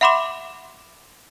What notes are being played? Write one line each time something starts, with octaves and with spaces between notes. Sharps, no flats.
E5 F#5 B5 C6 D6 E7